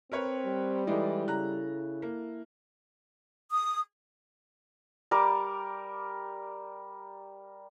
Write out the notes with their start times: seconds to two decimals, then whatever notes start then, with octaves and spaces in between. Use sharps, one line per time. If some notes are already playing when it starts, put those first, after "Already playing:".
0.12 C4 A#4 B4 C#5
0.45 G3
0.87 E3 G#3 D#4 E4 A4 D5
1.28 C#3 A#5 F#6
2.02 A#3
3.51 D#6
5.11 G3 A#4 D6